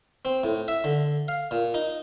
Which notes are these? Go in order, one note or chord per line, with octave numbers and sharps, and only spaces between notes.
C4
A2
E5
D3
F5
A#2
D#4